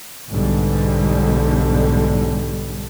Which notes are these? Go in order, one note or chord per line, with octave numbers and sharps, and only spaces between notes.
B1 G#2 D3 G3